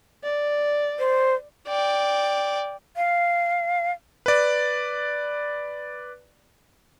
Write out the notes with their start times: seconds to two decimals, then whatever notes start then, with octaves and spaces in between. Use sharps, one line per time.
0.23 D5
0.99 C5
1.68 D5 G5
2.97 F5
4.26 B4 D5